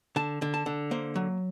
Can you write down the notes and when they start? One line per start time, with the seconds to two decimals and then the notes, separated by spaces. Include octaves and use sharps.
0.16 D3 A5
0.42 D3
0.54 A5
0.66 D3
0.91 A#3 C5
1.15 F#3